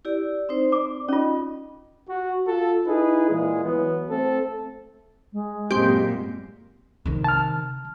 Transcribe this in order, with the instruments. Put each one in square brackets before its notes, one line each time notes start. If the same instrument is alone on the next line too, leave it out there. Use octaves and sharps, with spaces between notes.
[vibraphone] E4 G4 D5
C4 D#4 C5
[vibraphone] D5 [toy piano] D6
[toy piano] C#4 F4 [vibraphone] D#4 D#5
[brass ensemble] F#4
F4 A4
D#4 E4 G#4 B4
A#2 E3 G#3 G#4
E3 F#3 B3
A3 C4 A4
[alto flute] G#3
[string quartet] F#2 A#2 [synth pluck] C4 G4
[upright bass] C3 D#3
[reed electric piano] A5 F6